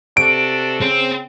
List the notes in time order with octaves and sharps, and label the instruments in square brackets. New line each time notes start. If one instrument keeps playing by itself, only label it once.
[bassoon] C3 [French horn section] D4 F#4 A4 [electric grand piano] D7
[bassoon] C#3 [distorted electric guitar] C4